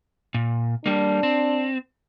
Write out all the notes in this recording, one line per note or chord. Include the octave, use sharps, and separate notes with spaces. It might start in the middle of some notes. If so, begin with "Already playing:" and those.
A#2
G3 A#3 D4
C4